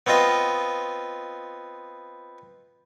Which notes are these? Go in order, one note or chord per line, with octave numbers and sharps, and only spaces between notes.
B3 C4 F4 D#5